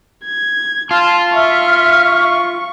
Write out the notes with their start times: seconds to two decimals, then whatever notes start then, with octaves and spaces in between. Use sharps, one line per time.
0.25 G#6
0.91 F4 A5 C6 F6
1.34 E5 C#6 F6